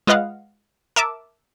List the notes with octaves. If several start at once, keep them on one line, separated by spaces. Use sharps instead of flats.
G#3 F4 B4 D#5 F5 F#5
A#4 E5 A5 D6